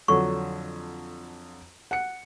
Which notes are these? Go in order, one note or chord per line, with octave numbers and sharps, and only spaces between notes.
F2 D3 F#3 C#6
F#5 C#7